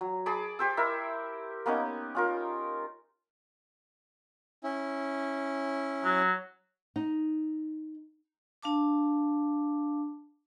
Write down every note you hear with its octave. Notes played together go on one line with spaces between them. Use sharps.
F#3
G#4 A5 B5 D6
G4 C5 E6
E4 A#4 E5
A#3 B3 C#4 D#4
C#4 F4 A#4
C#4 E4
F#3
D#4
D4 F5 A5 D6